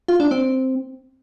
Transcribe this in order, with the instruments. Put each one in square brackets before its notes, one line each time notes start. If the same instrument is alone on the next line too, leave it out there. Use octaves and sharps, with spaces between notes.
[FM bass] F4
D4
C4